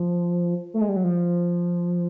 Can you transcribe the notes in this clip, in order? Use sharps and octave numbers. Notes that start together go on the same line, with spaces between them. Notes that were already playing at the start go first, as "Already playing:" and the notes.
Already playing: F3
A3
G#3
G3
F#3
F3